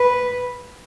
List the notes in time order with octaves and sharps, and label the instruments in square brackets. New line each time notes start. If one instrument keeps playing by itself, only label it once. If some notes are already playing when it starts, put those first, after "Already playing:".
Already playing: [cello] B4